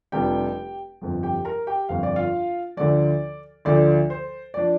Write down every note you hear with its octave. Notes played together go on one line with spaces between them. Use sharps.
F1 F2 C3 G3 D4 G4 G5
G1 F2 F3
G4 G5
A#4 A#5
G4 G5
G1 F2 F3 F5
D5
F4 F5
D2 D3 F3 D5
D2 D3 F3 D5
C5
F3 D4 D5